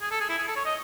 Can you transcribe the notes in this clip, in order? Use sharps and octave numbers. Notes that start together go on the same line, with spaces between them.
G#4
A4
G#4
E4
G#4
A4
C#5
D#5